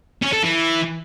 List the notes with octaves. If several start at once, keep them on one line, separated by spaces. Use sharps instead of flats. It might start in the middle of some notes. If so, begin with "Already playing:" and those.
C#4
A4
E3